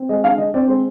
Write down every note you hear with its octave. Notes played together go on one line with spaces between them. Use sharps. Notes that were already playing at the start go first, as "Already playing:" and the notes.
Already playing: C4
G#3 D#5
D3 F5
D3 D#5
C4 D5
G#3 C5